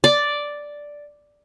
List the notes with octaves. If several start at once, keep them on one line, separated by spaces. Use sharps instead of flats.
D5